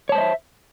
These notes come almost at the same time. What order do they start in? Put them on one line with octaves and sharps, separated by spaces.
C#5 A5 C5 D#5 E5